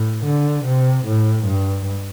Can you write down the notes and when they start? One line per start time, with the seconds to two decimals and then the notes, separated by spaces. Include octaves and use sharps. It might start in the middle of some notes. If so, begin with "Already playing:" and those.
Already playing: A2
0.25 D3
0.65 C3
1.06 A2
1.45 G2